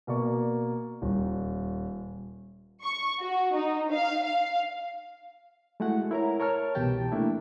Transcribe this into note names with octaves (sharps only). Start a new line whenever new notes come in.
B2 A#3 D5 C#6
D#1
C#6
F#4
D#4
F5
F5
G#3 A3 E4 F#4 F#5
E4 A#4 C#5 A#5
A#4 C#5 A5 F6
C2 B2 E3 G4 G5 A5
A3 A#3 D4 E4